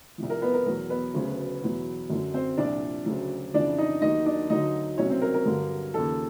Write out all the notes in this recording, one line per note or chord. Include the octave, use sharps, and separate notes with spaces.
C2 C3 F3
A#4
B3 B4
A#4
E2 B2 F#3 A#4
B3 B4
D2 C#3 F#3
E2 B2 F#3
F#2 D3 F#3
C4 C5
C2 A#2 F3 D4 D5
D2 C#3 F#3
F2 C#3 E3 D4 D5
D#4 D#5
D#2 D#3 F#3 D#4 D#5
D4 D5
D2 D3 F#3 D#4 D#5
C2 B2 F#3 C#4 C#5
C4 C5
A#4
A#4
G2 D3 F#3
D#2 C#3 F3 A4